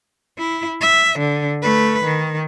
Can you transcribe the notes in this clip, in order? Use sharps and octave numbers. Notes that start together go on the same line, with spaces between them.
E4
E5
D3
A3 B4
D#3